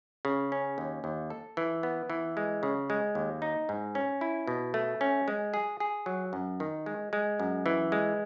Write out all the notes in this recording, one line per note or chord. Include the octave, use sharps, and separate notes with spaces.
C#3
C#4
D#2
D#2
A4
E3
B3
E3
G#3
C#3
G#3
D#2
D#4
G#2
C#4
E4
B2
A3
C#4
G#3
G#4
G#4
F#3
F#2
D#3
G#3
G#3
F#2
E3
G#3